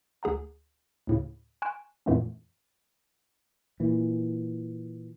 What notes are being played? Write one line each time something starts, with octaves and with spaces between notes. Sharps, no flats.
D2 G#4 F#5 A#5
D2 A2 C#3
G#5 C6 C#6 F#6 D7 E7
F2 A#2 E3 A3 B3 C#4
A#2 E3